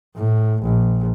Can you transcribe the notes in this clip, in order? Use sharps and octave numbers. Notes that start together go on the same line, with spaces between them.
A2
A#1